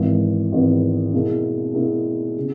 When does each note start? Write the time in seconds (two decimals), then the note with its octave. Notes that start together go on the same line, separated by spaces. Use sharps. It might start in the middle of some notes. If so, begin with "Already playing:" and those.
Already playing: G#1 G#2 E3 B3
0.52 G#1 G#2 E3 B3
1.13 B2 A#3 E4 G#4
1.74 B2 A#3 E4 G#4
2.38 C#3